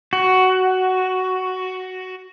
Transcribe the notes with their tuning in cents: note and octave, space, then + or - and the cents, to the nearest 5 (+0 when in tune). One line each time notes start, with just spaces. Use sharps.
F#4 +10